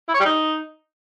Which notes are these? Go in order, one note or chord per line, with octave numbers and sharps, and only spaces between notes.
E4
C#5
G3
D#4